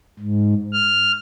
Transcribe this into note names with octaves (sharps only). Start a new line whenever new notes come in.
G#2
F6